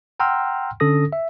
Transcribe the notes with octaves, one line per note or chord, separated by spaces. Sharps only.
F#5 G5 A#5 C6 E6 F6
D3 C#4 A4 D#6 A#6
E5